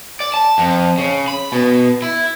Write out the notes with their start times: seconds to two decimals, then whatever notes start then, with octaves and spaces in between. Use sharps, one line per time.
0.20 D5
0.34 A5
0.58 F2
0.98 C#3
1.28 B5
1.52 B2
2.02 E4